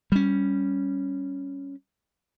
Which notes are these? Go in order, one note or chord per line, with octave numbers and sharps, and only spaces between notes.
G3 C#4